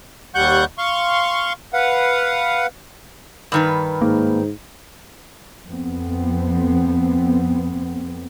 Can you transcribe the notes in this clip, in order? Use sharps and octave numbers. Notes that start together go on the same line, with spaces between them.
D#2 G3 F#5 C#6 F#6 G6
F5 C6 C#6
B4 F5 F#5
G2 D#3 B4
G#2 A#3
F2 B3 C4